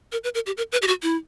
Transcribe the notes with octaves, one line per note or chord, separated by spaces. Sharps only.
A#4
B4
A#4
G4
A#4
B4
G4
F#4
E4